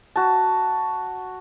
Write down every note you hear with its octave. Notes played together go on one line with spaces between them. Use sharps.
F#4 A5